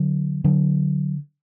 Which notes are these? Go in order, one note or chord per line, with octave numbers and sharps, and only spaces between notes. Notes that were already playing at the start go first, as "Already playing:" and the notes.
Already playing: D3 F#3
D3 F#3